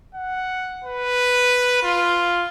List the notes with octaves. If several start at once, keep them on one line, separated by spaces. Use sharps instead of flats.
F#5
B4
F4